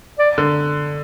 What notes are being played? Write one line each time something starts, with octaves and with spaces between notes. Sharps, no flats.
D5
D3